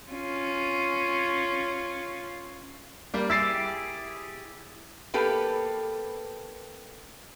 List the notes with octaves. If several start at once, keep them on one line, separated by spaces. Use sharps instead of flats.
C#4 F4
G3 A#3
E4 G4 G#4 E6 A6 C7
A#3 B3 G4 A4 B4